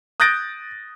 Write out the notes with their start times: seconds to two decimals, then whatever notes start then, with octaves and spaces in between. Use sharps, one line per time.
0.20 D#6 F#6 G6 A6 A#6 D7